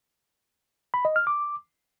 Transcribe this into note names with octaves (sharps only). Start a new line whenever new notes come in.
B5
D#5
F6
D6